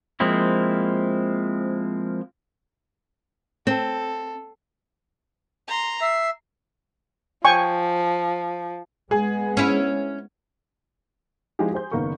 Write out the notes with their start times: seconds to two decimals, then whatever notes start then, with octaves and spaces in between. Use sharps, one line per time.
0.20 F3 G#3 A#3 C4 E4
3.67 C4 A4
5.68 A#5 C6
6.01 E5 C7
7.45 F3 G5 G#5 C#6
9.11 G#3 B3 G#4
9.57 C#4 E4
11.59 F3 G#3 D#4 E4 G4 G#4
11.72 G4 G#4 C5 G6
11.92 F#1 D#3 A#3 B3 C#6